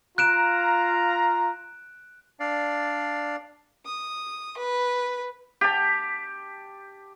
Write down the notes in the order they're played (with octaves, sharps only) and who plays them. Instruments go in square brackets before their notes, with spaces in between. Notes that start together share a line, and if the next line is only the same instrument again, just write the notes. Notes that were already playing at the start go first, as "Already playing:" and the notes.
[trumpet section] F4 F5 A#5 [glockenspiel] F#6 D7 E7
[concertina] D4 D5 F5
[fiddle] D#6
B4
[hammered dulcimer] G4 A5